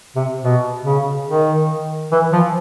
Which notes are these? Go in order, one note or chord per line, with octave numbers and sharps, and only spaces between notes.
C3
B2
C#3
D#3
E3
F3